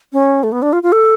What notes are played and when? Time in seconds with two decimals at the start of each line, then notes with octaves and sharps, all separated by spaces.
0.13 C#4
0.43 A3
0.52 B3
0.62 D4
0.73 F4
0.83 F4
0.92 A4